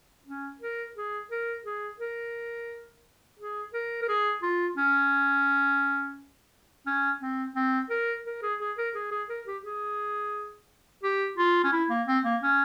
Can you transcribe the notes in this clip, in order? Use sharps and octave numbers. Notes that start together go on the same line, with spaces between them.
C#4
A#4
G#4
A#4
G#4
A#4
G#4
A#4
A#4
G#4
F4
C#4
C#4
C4
C4
A#4
A#4
G#4
G#4
A#4
G#4
G#4
A#4
G4
G#4
G4
F4
C#4
E4
A#3
C4
A#3
C#4